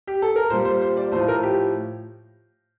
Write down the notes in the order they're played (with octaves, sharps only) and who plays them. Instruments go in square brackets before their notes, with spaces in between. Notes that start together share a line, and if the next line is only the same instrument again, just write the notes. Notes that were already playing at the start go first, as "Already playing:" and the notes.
[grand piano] G4
A4
A#4
A#2 C5
G3
C5
C5
D5
A2 F3 C5
A#4
G4